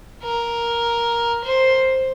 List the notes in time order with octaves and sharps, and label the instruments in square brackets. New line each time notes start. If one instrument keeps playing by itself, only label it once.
[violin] A#4
C5